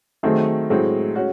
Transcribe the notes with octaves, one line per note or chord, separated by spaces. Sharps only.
D#3 F#3 A3 C4 D#4 G#4
A2 F#3 G#3 C4
C#4 F#4